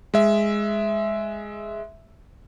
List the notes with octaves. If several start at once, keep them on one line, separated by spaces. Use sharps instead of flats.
G#3 E5